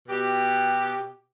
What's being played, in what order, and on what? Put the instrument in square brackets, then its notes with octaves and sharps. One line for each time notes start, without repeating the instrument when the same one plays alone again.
[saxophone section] B2 G4